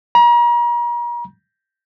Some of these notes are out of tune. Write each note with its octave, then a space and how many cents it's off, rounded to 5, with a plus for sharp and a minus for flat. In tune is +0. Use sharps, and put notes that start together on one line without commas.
A#5 +40